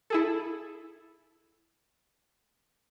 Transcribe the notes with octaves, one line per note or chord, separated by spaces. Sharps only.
E4 G#4 A4